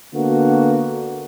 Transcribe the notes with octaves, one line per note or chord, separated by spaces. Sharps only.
D3 A#3 B3 F#4